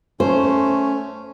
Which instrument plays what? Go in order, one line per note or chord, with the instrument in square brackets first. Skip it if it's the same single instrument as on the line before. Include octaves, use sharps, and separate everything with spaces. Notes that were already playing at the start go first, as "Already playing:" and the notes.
[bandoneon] A3 C#4 [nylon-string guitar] C5